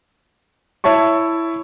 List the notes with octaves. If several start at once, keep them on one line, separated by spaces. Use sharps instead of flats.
E4 C#5 E5 A5 C#6